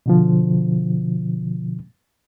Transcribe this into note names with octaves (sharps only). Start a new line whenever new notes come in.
B2 D3 F3